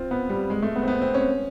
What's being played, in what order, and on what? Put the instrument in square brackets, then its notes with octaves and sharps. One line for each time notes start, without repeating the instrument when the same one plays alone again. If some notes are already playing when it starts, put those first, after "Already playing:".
Already playing: [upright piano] C4 F4
B3
G3
G#3
A3
B3
C4
B3
C4
C#4